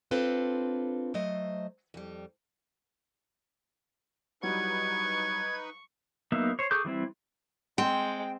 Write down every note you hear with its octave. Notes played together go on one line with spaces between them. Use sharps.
C4 D4 F4 A4 B4 C5
F#3 A3 C5 D#5
F2 G3
F#3 G3 D#4 E4 B4 C#6 G#6
F#3 A#3 B3 D#4 E5
C5 C#5
G#4 A4 C#6 D6 G6
E3 G3 C4 E4
G#3 C4 G5